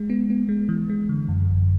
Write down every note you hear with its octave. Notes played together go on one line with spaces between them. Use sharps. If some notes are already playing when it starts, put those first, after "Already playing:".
Already playing: G#3
B3
B3
G#3
E3
G#3
D3
F#2
G#1